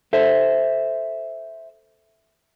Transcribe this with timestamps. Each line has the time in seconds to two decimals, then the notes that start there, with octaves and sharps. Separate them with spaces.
0.13 A4 C5 E5